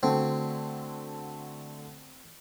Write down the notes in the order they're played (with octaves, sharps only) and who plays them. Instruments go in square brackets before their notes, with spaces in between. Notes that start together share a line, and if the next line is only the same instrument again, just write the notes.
[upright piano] D3 A3 F#4 [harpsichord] C4